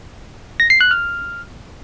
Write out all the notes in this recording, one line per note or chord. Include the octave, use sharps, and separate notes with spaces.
A#6
C7
F#6
F6